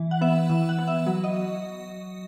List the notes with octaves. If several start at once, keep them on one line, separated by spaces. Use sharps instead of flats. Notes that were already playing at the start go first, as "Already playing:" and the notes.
Already playing: E3
F#5
B3 E5
E3 E5
F#5
B3
E5
F#3
D#5